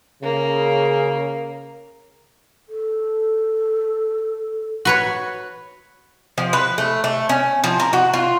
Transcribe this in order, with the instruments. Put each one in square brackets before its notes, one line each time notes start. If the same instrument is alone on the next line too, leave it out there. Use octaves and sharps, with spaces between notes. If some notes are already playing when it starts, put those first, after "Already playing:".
[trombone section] C#3 [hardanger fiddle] A#3
[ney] A4
[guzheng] F#4 B4 C#5
[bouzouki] F3
B4
A3
A3
C#4
F3
A#4
F#4
F4